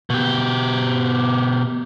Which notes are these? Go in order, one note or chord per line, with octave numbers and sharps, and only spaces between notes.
B2 G4